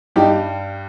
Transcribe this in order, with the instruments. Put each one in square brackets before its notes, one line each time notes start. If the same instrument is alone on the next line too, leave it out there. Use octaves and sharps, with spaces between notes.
[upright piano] G2 G3 D#4 G4